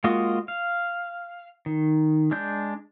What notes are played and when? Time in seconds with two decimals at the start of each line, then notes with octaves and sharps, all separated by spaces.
0.04 G#3 A#3 F4 F#4 D#5
0.48 F5
1.66 D#3
2.31 G#3 D4 G6